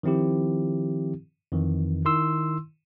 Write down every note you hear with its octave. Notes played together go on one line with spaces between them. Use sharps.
D#3 F3 C4 E4 G4
F2 D#3 E3
D#3 E4 C6 E6